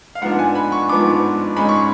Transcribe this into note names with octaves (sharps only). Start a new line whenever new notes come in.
F5
G#2 F3 B3 D4 F#5
G#5
B5
C#6
G#2 F3 B3 D4 D6
G#2 G#3 C#4 B5
C#6